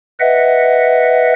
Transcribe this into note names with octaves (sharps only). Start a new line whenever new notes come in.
B4 D#5 E5 F#5